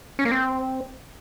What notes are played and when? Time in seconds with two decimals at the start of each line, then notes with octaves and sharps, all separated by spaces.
0.19 C#4
0.25 A#3
0.32 C4